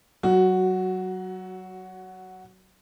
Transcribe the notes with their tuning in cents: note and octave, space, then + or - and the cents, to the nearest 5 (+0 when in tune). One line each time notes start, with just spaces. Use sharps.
F#3 +20 F#4 +0